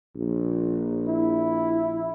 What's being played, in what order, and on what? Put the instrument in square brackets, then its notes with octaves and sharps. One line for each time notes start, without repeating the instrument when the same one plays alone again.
[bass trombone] A#1
[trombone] E4